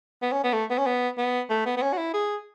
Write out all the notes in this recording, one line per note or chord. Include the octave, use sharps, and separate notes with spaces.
B3
C#4
B3
A3
B3
C#4
B3
B3
A3
B3
B3
C#4
F#4
E4
G#4